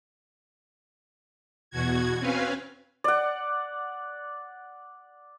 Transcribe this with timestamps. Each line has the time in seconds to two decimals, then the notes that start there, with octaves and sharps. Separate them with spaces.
1.70 E2 B2 F#4 G#6
2.18 C4 C#4 B4 F5 G#5
3.04 D5 F#5